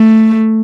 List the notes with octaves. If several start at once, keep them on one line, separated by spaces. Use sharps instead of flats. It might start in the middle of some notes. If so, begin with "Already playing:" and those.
Already playing: A3